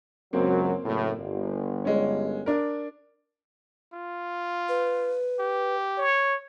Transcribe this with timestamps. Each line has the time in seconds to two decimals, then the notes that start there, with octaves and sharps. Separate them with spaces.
0.33 C#2 F#2 F#3 A#3 C4
0.84 F#1 A2
1.19 G1
1.85 G#3 C#4
2.46 D4 A#4
3.93 F4
4.69 B4
5.39 G4
5.98 C#5